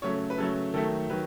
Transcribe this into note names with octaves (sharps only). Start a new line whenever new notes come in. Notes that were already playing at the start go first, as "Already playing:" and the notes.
C#3 F#3 A3 C#5
B4
C#3 F#3 A3 A4
D#3 F#3 A3 A4
D#3 F#3 B4